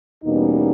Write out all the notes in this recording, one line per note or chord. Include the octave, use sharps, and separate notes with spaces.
E2 B2 G3 A#3 C#4 D#4